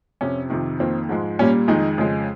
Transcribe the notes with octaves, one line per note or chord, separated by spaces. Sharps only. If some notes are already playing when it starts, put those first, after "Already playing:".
F2 C3 F3 C#4
F2 C3 D#3
F2 D#3 A#3 C4
G#2 F3 G#3
A#2 G3 A#3 C#4
F2 D#3 G#3 D#4
F2 C#3 G#3